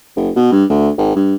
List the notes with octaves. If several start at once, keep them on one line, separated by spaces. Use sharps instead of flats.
F#1
B2
G2
D2
G#1
G2